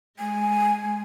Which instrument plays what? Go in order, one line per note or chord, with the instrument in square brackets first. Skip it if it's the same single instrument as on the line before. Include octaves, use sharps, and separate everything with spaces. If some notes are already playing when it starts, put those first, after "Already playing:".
[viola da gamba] G#3 [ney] G#5